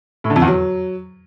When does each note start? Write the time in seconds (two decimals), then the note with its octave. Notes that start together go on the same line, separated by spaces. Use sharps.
0.24 A2
0.30 D3
0.36 F2
0.42 E2
0.47 F#3